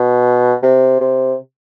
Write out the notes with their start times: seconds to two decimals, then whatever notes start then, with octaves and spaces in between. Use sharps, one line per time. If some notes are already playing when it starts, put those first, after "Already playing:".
Already playing: B2
0.62 C3
1.00 C3